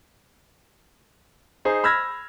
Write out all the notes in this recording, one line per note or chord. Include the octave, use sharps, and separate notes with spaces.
D#4 G#4 C5
B5 E6 F6 G#6 A#6